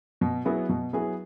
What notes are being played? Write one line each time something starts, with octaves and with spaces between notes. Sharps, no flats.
B2
F#3 B3 E4 G#4
B2
F#3 B3 E4 G#4